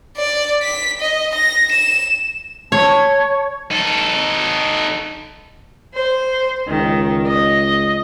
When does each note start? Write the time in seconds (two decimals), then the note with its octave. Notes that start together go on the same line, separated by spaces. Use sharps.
0.17 D5
0.63 B6
1.01 D#5
1.35 A#6
1.72 E7
2.72 C#5 A5
3.71 D#4 A4
5.94 C5
6.68 C#2 D#3
7.27 D#5